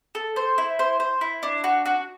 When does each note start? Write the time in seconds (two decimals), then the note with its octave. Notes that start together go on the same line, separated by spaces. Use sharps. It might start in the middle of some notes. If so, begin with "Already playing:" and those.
0.15 A4
0.36 C5
0.58 E4
0.79 C5
1.00 C5
1.21 E4
1.43 D4
1.64 F#4
1.86 F#4